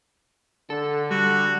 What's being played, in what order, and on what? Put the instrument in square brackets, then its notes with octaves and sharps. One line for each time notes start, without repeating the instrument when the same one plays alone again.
[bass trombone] D3 [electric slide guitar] A4
[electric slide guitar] G3 [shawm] F#4